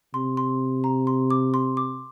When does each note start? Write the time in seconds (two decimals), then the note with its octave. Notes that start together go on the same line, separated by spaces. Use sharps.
0.14 C3 C6
0.37 C6
0.84 A#5
1.07 C6
1.30 D6
1.54 C6
1.77 D6